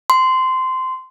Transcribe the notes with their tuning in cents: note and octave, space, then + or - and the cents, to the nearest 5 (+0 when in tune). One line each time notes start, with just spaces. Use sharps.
C6 -15